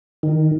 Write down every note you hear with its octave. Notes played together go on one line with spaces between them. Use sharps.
D#3